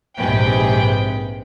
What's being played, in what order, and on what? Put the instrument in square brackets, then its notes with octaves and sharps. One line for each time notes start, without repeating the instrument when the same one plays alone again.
[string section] A#1 G#2 C3 G#4 B4 G5